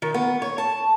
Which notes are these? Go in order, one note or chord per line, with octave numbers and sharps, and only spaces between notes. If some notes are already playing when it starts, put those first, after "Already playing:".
D#3
B3
C#5
A5